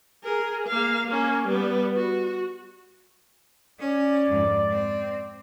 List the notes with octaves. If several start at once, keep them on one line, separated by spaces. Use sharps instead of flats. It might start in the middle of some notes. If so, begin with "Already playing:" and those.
G#4 A#4
A#3 F5
A#3 C#4
G3 B3
F#4
C#4 D5
F2 G#2
C4